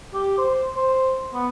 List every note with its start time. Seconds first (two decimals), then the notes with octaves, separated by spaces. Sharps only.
0.14 G4
0.38 C5
0.77 C5
1.34 B3